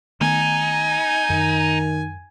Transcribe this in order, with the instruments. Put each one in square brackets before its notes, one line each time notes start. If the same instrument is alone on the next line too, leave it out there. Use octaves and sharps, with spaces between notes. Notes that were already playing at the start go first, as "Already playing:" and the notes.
[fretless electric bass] D#3 A3 B3 [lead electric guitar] D#4 [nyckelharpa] G#5
[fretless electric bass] F#2 [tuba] D#3